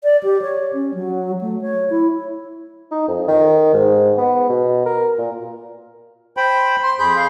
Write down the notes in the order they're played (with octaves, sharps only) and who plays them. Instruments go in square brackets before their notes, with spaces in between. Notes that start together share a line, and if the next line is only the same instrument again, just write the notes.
[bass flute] D5
G4
C#5
C#4
F#3
A3
C#5
E4
[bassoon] D#4
F2
D#3
G#2
B3
B2
A#4
A#2
[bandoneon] C5 G5 B5
[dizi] C6
[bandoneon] F2 G#4 G6 [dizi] B5
[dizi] F5